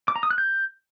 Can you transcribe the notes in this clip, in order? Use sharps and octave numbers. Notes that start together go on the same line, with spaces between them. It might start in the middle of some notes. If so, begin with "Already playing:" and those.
D6
A#5
D#6
F#6
G6